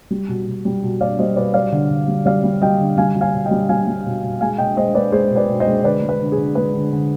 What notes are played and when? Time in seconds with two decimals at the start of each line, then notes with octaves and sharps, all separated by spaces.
0.11 G3
0.28 B2
0.46 B2
0.65 G3
0.83 B2
1.01 B2 D5 F5
1.19 G3 C5 D#5
1.36 B2 B4 D5
1.54 G3 D5 F5
1.72 D3
1.90 D3
2.08 G3
2.25 G3 D5 F5
2.43 G3
2.62 G3 D#5 G5
2.80 D3
2.98 G3 F5 G#5
3.16 G3
3.21 F5 G#5
3.33 B2
3.45 D#5 G5
3.51 G3
3.69 G3 F5 G#5
3.87 G3
4.06 B2
4.23 B2
4.41 G#3 F5 G#5
4.58 B2 D#5 G5
4.77 G#3 C5 D#5
4.95 G#3 B4 D5
5.12 G#3 G#4 C5
5.30 B2
5.36 B4 D5
5.48 B2
5.60 C5 D#5
5.67 G#3
5.84 D3 B4 D5
6.02 G#3
6.09 B4
6.21 D3
6.32 G#4
6.37 D3
6.55 G#3 B4
6.74 D3
6.92 D3